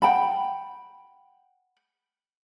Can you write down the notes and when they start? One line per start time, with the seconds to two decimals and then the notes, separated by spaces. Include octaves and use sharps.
0.02 F#5 G5 A5 B5